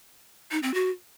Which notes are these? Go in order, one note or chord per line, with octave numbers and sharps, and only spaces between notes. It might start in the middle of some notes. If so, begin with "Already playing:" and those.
D#4
C4
F#4